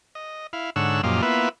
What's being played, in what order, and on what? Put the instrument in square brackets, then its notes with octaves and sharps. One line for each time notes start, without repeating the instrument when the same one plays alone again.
[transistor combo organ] D#5
E4 F5
G#2 D3 C#5 F#5 E6
F#2 A#2 F3 G4 D#5 F5
A#3 B3 E4 F4 B4 E5